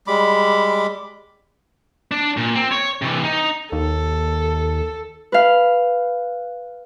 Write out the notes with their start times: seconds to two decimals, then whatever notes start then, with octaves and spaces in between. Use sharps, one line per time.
0.07 G3 G#3 B5 D6
2.11 D4
2.37 A#2
2.55 C4
2.71 C#5
3.02 C3 E3
3.23 D#4
3.72 D#2 A4
5.32 B4 F5